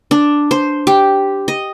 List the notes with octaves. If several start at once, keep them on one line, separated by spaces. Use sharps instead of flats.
D4
C5
G4
D#5